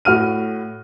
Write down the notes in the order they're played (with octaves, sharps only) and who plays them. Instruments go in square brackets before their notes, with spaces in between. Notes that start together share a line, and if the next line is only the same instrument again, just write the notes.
[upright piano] A2 F#4 F6 D#7